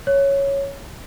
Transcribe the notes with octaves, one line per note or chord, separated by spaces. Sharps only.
C#5